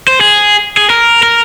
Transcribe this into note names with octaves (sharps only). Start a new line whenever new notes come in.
C5
G#4
G#4
A#4
A#4